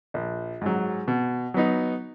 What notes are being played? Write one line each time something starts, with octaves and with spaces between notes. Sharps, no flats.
A#1
G#2 F#3
B2
F#3 B3 D#4